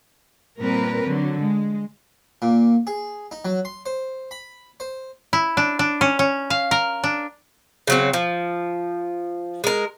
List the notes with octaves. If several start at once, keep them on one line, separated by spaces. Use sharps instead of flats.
A#2 G3 C4 A#4 B4
D3 F#3
G#3
A#2
G#4
D#4
F#3
C6
C5
B5
C5
E4
D4
D4
C#4
C#4
F5
A#4
D4
C#3 F#3 C4
F3
G#3 A#4